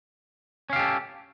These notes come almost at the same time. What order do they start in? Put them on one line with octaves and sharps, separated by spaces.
C#4 F5 G4 A4